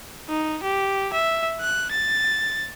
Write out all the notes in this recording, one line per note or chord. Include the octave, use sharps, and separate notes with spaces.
D#4
G4
E5
F#6
A6